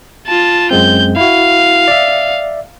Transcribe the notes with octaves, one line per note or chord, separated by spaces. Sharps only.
F4 A5
F#2 G#3 C4 G6
E4 F#4 F5
D5 E5